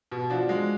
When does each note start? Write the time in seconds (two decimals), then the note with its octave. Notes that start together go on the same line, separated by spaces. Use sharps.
0.12 B2
0.30 F3 D4 F#4
0.49 G#3